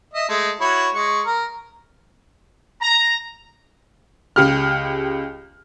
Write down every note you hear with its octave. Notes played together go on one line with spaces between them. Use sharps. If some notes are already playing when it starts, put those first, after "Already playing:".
D#5 E5
G#3 A3
E4 F#4 C#5
G#3 C#6
A#4
A#5
C#2 G4 F6